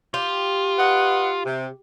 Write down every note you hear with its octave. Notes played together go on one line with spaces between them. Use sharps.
F4 G4
B4 D#5 F#5
C3